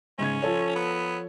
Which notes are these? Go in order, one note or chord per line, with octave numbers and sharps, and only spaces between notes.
G#2 C#3 C#4 G#6
F3 A4 C#5
B3